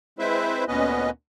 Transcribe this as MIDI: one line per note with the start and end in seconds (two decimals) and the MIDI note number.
0.19 0.64 56
0.19 0.64 60
0.19 0.64 64
0.19 0.64 71
0.19 0.64 72
0.19 0.64 76
0.68 1.10 38
0.68 1.10 46
0.68 1.10 59
0.68 1.10 61
0.68 1.10 71
0.68 1.10 75